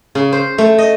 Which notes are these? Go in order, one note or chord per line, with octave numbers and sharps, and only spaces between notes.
C#3
C5
A3
D#5